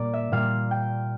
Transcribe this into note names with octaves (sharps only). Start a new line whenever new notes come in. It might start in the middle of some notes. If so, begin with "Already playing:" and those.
Already playing: A#2 G3 A#3 D5
E5
A#2 G3 A#3 F5
G5